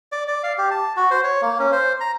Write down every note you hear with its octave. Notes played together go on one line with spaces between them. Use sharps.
D5
D5
F5
G4
A5
F#4
C5
C#5
A#3
C#4
C5
A#5